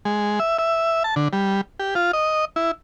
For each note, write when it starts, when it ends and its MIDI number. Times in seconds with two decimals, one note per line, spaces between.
0.05 0.39 56
0.39 0.57 76
0.59 1.03 76
1.04 1.15 81
1.16 1.28 50
1.33 1.61 55
1.79 1.94 67
1.95 2.11 65
2.13 2.45 75
2.56 2.71 64